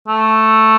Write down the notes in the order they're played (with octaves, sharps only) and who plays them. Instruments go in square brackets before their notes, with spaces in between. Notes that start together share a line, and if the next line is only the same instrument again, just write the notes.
[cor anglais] A3